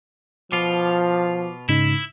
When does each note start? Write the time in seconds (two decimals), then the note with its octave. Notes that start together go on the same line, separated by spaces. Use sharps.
0.52 B2 F3 F4 D6
1.69 G#2 C#3 D#4 E4